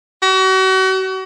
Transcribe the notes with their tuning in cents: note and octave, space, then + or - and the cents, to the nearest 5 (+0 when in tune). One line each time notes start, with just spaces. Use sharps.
F#4 +35